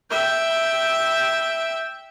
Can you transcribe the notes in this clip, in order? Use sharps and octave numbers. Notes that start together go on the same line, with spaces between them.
E5 G5